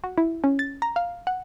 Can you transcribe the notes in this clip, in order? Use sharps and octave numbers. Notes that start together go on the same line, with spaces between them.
F#4
E4
C#4
A6
A#5
F5
F#5